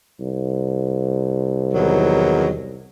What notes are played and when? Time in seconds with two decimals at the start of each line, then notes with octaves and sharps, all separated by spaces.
0.20 C2
1.74 E2 D#3 F#3